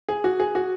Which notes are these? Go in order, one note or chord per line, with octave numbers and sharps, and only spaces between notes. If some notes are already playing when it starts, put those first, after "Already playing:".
G#4
F#4
G#4
F#4